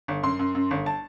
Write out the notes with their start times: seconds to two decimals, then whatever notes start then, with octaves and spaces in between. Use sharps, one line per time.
0.08 G1
0.23 F#2 C6
0.39 F#2
0.55 F#2
0.71 G1
0.86 A5